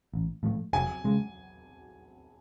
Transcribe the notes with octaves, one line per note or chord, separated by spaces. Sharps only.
A1
A2 F3 A3
F1 G#5
C#3 G#3